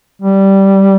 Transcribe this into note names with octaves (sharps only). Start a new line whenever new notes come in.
G3